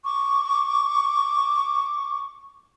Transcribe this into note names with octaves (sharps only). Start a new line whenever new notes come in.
C#6 D6